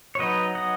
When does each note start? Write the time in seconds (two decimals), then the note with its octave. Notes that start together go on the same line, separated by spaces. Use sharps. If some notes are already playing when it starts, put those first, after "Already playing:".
0.15 C#5
0.19 F#3 B3 D#4 B4 D#5
0.55 D#5 F#5